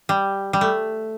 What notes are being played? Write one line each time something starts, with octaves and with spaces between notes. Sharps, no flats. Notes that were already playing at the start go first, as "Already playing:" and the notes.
G3
G3
A3